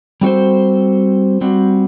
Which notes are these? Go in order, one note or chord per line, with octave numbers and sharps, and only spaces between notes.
G3 C4 F#4 A4 C5
G3 C4 F#4